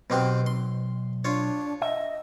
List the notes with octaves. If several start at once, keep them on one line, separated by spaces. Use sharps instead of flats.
B1 B2 C4 G4
C6
D4 F4 C#5
D#5 E5